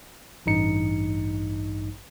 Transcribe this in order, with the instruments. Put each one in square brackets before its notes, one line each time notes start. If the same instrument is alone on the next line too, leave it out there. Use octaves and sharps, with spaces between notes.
[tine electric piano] A1 G2 D#4 C#7